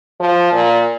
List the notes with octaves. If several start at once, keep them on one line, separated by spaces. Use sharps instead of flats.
F3
A#2